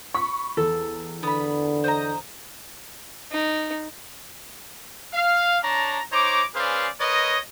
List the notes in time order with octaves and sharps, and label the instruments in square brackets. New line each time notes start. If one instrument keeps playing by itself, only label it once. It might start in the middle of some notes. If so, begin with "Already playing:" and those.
[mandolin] B5 [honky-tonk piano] C#6
[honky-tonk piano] E2 [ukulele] A4
[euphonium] D3 [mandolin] B3 B5
[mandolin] C5 D#5 A#5
[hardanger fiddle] D#4
[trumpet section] F5
D4 C#5 A5 A#5
D#4 C5 C#5 A#5 D6
C#4 G#4 B4 C5 D5 F5
A#4 B4 C#5 D#5